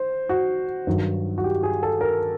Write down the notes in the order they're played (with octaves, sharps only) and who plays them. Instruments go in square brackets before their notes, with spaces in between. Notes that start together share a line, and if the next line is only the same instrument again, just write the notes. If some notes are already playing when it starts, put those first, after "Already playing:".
Already playing: [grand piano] C5
F#4
G2 D#3 F#3
F#4
G4
G#4
A4
A#4